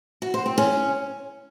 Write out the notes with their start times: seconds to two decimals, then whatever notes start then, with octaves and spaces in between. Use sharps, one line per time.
0.22 F#4
0.34 C5
0.46 C4
0.58 C#4